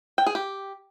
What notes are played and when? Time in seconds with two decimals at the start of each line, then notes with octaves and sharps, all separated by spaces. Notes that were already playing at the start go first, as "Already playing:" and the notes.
0.18 G5
0.26 G#4
0.35 G4